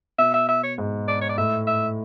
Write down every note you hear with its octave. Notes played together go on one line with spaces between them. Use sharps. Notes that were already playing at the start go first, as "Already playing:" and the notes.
B2 E5
E5
E5
C#5
G#2
D5
C#5
D5
A2 E5
E5